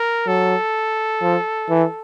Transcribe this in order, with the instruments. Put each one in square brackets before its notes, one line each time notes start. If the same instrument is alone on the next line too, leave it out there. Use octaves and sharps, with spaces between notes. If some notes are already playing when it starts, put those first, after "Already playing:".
Already playing: [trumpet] A#4
[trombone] F#3 [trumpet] A4
[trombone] F3
E3